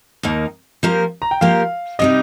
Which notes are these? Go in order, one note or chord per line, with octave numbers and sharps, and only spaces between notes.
D#2 D#3 A#3 D#4
F3 A#3 G4 A#4
A#5
G5
F3 A#3 G4 A#4 F5
C3 G3 D#4 D#5